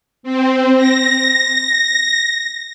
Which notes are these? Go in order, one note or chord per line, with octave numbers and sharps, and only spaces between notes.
C4
A#6